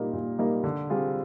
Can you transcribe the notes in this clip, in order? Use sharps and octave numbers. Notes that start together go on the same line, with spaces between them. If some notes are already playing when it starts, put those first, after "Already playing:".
Already playing: A#2 G3 A#3 D#4 A#4
A#2
G3 A#3 D#4 A#4
D3
G3 C4 F4 G#4